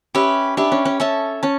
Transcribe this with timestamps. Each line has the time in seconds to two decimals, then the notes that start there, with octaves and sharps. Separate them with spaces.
0.15 C#4 G4 B4 E5
0.57 D4 G4 B4 E5
0.72 C#4
0.85 C#4
1.00 C#4 A4 E5 A5
1.43 C#4 A5